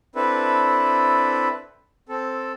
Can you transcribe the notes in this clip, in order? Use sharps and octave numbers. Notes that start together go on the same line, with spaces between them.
C4 D4 E4 A4 B4
C4 A4